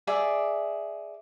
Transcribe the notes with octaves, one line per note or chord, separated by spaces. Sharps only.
G#4 D5 E5